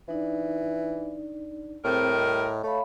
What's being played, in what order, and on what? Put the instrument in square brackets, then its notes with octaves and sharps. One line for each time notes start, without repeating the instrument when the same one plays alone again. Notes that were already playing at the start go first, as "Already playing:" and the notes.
[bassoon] E3 [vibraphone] D4 D#4 D5
[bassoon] A2 [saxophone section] G3 A#4 [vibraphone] C4 G#4 C5
[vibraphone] D#5
[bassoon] A3 [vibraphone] C#5 F5 B5